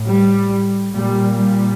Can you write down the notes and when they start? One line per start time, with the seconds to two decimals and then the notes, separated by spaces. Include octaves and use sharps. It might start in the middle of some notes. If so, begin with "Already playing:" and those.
Already playing: A2
0.08 G3
0.92 A#2 G3
1.34 G3